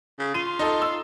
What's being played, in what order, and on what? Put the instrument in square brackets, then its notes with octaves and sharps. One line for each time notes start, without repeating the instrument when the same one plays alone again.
[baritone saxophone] C#3
[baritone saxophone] F4 [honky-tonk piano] D#7
[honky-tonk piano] D#4 A4
E6